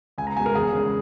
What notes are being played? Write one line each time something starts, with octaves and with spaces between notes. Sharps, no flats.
C#2 G#5
A#5
B2 G#3 G#5
A#4
E2 G#4
C#3 G#3